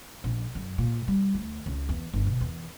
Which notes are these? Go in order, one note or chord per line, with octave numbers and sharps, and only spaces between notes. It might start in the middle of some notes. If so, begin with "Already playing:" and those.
A#1
F#2
A#2
G3
D2
C#2
E2
G1
B2
E2